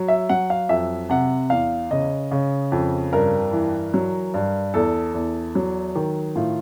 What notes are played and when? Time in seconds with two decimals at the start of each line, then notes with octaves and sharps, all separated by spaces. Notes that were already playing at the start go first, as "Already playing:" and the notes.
Already playing: F#3
0.08 E5
0.29 F#3 F#5
0.50 F5
0.69 F2 E5
1.09 C3 F#5
1.50 E2 F5
1.91 C#3 D#5
2.31 C#3
2.72 F2
3.12 G2 A#4
3.52 E3
3.94 F#3
4.34 G2
4.74 E2 A4
5.14 E2
5.55 F#3
5.95 D#3
6.35 A2 F4